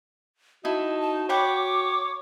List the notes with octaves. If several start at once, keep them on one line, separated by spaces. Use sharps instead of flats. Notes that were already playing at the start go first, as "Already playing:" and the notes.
D#4 E4 F#4 A5
A5
C#5 F#5 G5 B5 D6